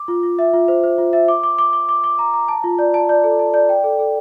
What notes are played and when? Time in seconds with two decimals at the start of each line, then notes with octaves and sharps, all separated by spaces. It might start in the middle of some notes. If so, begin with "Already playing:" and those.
Already playing: D6
0.08 F4
0.23 F4
0.39 E5
0.53 F4
0.68 C5
0.83 C5
0.98 F4
1.13 E5
1.28 D6
1.43 D6
1.58 D6
1.73 D6
1.89 D6
2.04 D6
2.19 A#5
2.34 A#5
2.48 A5
2.64 F4
2.79 D5
2.94 A5
3.09 D5
3.24 A4
3.39 A5
3.54 D5
3.69 G5
3.84 A4
3.99 A4